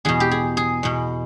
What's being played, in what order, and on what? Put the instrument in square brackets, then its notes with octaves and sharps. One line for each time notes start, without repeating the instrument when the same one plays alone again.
[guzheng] E2 B2 G#4
G4
G#4
G#4
E2 B2